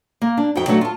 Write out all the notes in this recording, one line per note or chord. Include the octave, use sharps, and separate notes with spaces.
A#3
D4
F2 D#4 F#4 G5
D3 F#3 A3 F#4 F#5
F4 A5